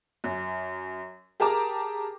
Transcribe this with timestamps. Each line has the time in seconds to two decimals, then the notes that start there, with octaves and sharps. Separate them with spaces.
0.24 F#2
1.40 G4 G#4 A#4 A5 A#5 D6